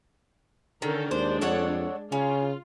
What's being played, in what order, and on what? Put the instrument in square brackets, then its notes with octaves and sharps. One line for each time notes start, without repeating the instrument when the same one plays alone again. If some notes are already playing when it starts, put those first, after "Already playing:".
[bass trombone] D3 [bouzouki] D#3 [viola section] C#4 A4 A#4
[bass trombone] D#2 [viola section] G#3 D4 [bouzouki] C5
[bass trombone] F2 [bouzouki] A4 C#5 F#5
[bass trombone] C#3 [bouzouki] C#4 [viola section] F4